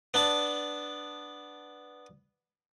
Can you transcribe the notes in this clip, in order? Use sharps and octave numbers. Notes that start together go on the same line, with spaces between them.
B3 D4 A5